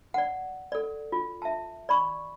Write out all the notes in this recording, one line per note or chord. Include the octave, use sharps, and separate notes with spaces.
D5 F#5
A4 D5
F4
E5 A5
D5 B5 C#6